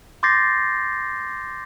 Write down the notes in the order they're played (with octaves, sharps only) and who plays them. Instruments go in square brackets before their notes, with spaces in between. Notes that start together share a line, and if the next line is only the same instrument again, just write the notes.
[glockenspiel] C6 D6 G6 A6 A#6 C7